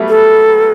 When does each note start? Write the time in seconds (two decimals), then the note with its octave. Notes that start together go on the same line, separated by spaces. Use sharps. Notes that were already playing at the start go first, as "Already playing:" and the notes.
Already playing: F#3 G3 A3 B3
0.09 A4